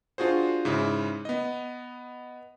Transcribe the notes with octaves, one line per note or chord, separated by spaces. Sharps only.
D4 F4 F#4 G#4 C5
G#2 C#3 E4
B3 D#5